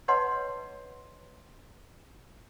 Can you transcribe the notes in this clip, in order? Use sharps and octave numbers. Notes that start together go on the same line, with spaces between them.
B4 C#5 D#5 F#5 A5 C6